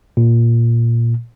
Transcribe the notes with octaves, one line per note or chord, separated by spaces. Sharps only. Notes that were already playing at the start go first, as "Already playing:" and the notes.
A#2